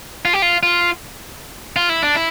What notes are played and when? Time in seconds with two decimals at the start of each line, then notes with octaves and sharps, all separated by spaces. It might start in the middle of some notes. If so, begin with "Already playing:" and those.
0.25 F4
0.33 G4
0.42 F4
0.63 F4
1.76 F4
1.89 E4
2.02 D4
2.15 E4